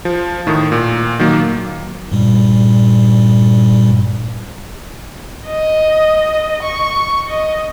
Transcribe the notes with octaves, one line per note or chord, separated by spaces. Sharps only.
F3
A2 D#3
A#2
D#3 F#3 A#3
G2 A#2 G3
D#5
C#6
D#5